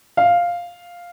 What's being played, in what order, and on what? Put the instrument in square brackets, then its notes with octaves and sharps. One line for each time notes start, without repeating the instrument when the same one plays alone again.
[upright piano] F5